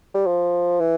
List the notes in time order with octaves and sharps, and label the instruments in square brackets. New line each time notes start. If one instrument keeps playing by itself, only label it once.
[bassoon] G3
F3
E3